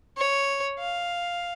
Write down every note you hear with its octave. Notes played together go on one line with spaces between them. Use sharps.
C#5
F5